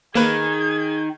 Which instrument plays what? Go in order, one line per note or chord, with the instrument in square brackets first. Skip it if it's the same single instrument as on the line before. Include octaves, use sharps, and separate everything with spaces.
[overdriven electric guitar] D#3 [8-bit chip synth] A#3 B4 [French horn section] G#4 [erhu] G#6